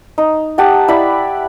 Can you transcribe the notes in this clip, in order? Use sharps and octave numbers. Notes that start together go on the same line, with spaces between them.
D#4
G4 F#5 A5
E4 D5 B5